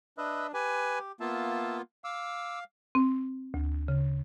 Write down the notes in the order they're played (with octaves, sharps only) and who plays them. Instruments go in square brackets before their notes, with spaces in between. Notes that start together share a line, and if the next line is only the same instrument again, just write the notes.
[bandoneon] D4 [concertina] B4 D#5 E5
[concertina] G4 [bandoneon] B4 G#5
[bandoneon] A#3 B3 F4 [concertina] E5 A5
[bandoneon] F5 [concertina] D6 E6
[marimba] C4
D2
C#3